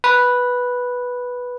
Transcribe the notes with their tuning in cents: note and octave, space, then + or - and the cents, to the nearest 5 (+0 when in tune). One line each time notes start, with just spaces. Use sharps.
B4 -5